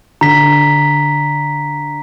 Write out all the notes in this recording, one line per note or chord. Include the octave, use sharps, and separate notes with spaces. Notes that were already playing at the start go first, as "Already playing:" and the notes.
D3 A#5 B6